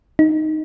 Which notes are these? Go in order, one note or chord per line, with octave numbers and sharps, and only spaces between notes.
D#4